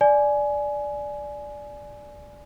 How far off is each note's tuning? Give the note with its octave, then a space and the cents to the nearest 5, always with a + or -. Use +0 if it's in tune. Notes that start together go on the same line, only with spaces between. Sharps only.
D5 +0 G#5 +15